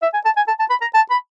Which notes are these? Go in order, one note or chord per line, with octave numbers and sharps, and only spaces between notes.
E5
G#5
A5
G#5
A5
A5
B5
A#5
A5
B5